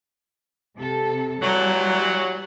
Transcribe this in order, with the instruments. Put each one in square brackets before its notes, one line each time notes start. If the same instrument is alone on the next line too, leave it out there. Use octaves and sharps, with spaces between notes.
[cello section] C3 A4
[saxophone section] A#2 E3 F#3 [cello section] G3